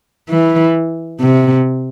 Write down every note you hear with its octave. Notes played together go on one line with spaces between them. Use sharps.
E3
C3